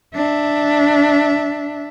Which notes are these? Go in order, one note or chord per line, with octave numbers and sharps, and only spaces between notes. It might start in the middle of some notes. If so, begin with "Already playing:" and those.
D4 E5